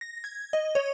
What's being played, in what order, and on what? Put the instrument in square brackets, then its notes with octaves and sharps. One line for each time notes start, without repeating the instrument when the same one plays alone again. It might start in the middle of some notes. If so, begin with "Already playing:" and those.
[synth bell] A#6
G#6
D#5
C#5